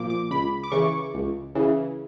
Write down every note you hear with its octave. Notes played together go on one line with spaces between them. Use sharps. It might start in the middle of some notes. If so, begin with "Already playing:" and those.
Already playing: A#2 F3 D6
D6
C#2 B5
D6
C#3 E3 C#6
C#2
C#3 E3